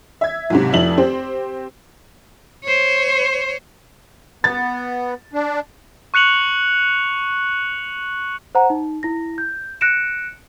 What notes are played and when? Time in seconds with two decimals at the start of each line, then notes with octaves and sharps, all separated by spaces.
0.21 E5 G#6
0.50 B1 G#2 C3
0.73 F1 F2 E4 F#7
0.98 C4 G4 C5
2.64 C5 C#5
4.44 B3 A6
5.33 D4
6.14 C#6 F#6 C#7 F7 F#7
8.55 C5 F#5 A#5
8.70 D#4
9.03 E4 A#6
9.38 G6
9.81 F#6 A#6 C#7 D7 E7